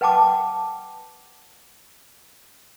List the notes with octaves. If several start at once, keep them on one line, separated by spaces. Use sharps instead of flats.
B4 F#5 G5 A5 D6